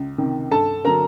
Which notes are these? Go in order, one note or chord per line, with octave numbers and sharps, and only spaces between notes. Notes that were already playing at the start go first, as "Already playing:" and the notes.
Already playing: C#2
C3 D#3
G2 A4 A5
D3 F#3 A#4 A#5